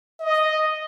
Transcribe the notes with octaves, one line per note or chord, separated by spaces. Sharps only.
D#5